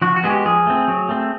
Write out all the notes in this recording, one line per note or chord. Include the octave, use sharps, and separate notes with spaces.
F3 F#4
F#4
G#3 B3 G#4
G4
F3 G#4
A3 C4
F#3
A3 C4